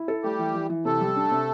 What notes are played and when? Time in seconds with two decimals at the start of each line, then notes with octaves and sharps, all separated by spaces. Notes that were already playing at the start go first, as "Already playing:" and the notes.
Already playing: E4
0.08 A4
0.24 G3 A3 G4
0.39 E3
0.54 E3
0.70 E3
0.85 C3 A3 A4
1.01 G3
1.16 D4
1.31 C3